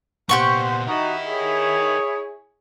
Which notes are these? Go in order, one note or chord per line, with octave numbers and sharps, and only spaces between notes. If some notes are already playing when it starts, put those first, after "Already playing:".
A#2 B3 G4 C5 F#5 C#6
D#4 E4 F#4 A#4 D#5
G#4 C#5